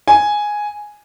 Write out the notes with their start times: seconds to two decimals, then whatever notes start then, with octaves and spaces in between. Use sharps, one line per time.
0.08 G#5